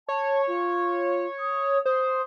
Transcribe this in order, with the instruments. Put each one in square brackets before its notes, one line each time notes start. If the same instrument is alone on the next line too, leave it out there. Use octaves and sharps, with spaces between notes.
[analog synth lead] C#5 [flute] A5
[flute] F4
D#6
[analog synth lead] C5 [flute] D#6